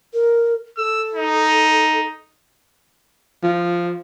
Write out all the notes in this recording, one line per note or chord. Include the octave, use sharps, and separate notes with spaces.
A#4
A4 E6
D#4
F3